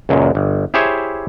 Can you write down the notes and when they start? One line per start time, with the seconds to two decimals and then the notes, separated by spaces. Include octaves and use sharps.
0.09 C#2 F#2 A#2
0.35 G1
0.74 E4 G4 G#4 C5 C#5 E5